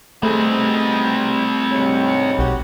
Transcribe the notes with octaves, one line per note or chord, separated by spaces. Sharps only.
G3 A3 B3 C4 D#4 G#4
D2 G#2 C#5
B1 F#4 G4